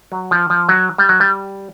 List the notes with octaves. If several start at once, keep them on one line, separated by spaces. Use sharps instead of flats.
F#3
F3
F3
F#3
G3
F#3
G3